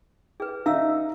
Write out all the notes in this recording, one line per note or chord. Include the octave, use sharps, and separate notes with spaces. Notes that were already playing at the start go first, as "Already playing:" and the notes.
G#4 B4
D#4 E5 F5 E6